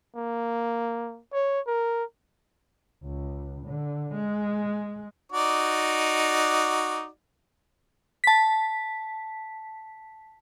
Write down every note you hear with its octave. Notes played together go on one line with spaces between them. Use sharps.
A#3
C#5
A#4
C#2
D3
G#3
D#4 F#4 D5
A5 B6